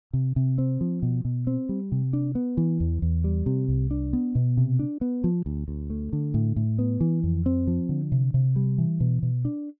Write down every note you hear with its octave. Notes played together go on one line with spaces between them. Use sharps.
C3
C3
C4
F3
B2
B2
C4
G3
C3
D4
B3
E3
E2
E2
G3
C3
C2
D4
B3
B2
C3
D4
B3
F3
D2
D2
A3
D3
A2
A2
B3
E3
F2
C4
F3
D3
C3
C3
G3
E3
B2
B2
D4